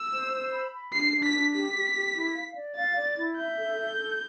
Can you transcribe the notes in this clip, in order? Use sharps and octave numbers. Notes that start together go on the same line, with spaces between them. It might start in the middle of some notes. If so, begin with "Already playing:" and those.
Already playing: E6
C5
C5
B5
B5
D4 C7
D4
B6
D4
G4 B6
G4
G4
E4
F5
D5
F5 A6
D5
E4
E5 G6
A4
A4
A4